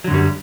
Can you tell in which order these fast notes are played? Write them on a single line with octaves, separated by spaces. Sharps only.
F#3 D3 F#2 G3